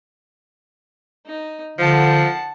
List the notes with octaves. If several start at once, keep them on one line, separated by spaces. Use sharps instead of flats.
D#4
D3 F3 F#5 A5